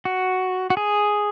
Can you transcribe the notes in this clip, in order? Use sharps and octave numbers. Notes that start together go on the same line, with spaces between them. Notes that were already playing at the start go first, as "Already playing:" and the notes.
F#4
F#4
G#4